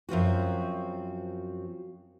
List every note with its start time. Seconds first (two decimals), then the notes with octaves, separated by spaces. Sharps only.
0.09 F#2 F3 C4 F#4